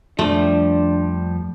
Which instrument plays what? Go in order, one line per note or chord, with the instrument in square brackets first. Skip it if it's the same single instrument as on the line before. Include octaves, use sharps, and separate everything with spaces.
[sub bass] F2 [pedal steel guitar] F3 G3 [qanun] A3 [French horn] D4